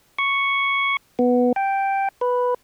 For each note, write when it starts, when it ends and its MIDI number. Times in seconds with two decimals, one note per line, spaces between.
0.19 0.97 85
1.19 1.53 59
1.56 2.09 79
2.21 2.54 71